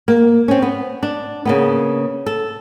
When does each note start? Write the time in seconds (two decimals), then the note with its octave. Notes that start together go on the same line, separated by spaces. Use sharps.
0.08 A#3
0.48 C4 C#4
0.62 B3
1.03 D4
1.45 C#3 A#3 B3
2.26 A4